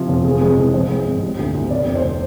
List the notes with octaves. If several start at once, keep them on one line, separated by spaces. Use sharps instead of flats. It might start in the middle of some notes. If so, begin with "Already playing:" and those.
Already playing: C3 F3
F1
F3 G#4
G#3
B4
C2
F3 C5
G#3
G#1
G3
D2
D2
C3 D5
F1
C5